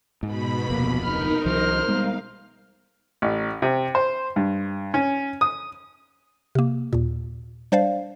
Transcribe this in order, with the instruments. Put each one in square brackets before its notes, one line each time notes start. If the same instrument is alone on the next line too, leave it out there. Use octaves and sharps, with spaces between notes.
[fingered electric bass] G#2 [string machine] B2 B5
[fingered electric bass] D1 F2 C3 [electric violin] A#3
[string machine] D#4 A#4 [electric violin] B5 F6
[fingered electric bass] C2 E3 F#3 [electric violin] C5 F6
[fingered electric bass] G3 G#3 B3 [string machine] F5
[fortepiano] A1
C3
C5
G2
C#4
D#6
[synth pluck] C3 A#3
D#2 A#2
G3 D4 C5 D5 F5